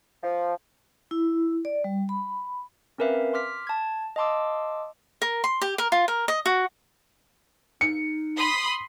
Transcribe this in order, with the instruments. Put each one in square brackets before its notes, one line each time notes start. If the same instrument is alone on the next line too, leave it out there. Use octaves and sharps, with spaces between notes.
[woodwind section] F3
[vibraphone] E4
D5
G3
B5
[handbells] C4 C#4 A#4 B4 E5 F5
C6 D6 F6 B6
A5 G#6
D#5 F5 A5 C6 D6 E6
[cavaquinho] A#4
C6
G4
A#4
F4
A#4
D#5
F#4
[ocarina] D#4 [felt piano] C#7
[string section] B5 C6 D#6